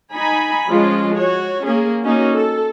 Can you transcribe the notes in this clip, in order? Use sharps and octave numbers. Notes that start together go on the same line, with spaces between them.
D#4 G#5 B5
F3 G#3 C#4 F4
F#4 C#5
A#3 C#4 G#4
A#3 C#4 D#4 F#4
A4